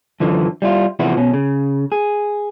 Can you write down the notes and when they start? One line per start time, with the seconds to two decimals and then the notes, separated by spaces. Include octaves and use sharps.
0.20 F#2 D3 E3 F3
0.62 G3 E4 F4
0.99 C3 E3 F3 B3 E4 F#4
1.17 B2 C#4
1.33 C#3
1.92 G#4